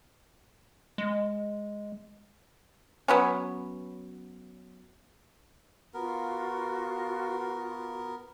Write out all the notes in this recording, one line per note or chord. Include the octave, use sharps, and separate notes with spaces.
G#3
F#3 B3 C#4
B3 F4 F#4 A#4